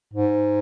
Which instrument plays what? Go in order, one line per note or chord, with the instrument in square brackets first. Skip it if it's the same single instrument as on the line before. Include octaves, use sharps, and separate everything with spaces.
[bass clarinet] G#2